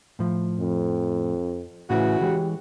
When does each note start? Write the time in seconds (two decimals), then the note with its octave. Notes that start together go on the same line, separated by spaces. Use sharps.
0.19 A2 F3
0.60 F2
1.90 A2 C#3 E3 F#4
2.21 E3 G#3 G4 C#5